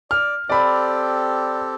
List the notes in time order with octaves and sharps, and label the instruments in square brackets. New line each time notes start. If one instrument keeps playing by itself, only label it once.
[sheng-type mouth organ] D5 [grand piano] F6
[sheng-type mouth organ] C4 G4 A4 [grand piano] D5 B5